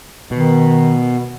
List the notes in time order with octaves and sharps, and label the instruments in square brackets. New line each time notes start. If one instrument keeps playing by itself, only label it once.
[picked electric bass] B2 [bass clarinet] D#3